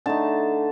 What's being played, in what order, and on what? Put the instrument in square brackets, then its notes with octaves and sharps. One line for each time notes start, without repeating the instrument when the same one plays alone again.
[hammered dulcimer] D3 A3 D#4 A5